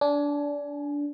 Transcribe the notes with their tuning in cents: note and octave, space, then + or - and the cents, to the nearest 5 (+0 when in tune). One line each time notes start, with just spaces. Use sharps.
D4 -20 G#5 +15